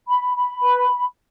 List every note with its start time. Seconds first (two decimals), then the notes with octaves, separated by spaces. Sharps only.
0.08 B5
0.35 B5
0.62 B4